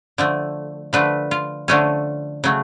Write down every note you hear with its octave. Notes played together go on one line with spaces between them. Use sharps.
D3 F3 A3
D3 F3 A3 B4
F4
D3 F3 A3 C#4
C#3 F#3 A3